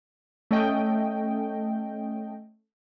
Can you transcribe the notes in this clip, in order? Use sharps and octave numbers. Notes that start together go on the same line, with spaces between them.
A3 C#4 D#5 G5